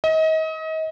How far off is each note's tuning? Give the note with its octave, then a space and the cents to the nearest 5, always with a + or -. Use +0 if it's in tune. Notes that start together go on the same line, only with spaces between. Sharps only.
D#5 +35